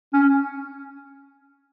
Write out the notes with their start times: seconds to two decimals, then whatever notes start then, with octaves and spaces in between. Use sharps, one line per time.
0.13 C#4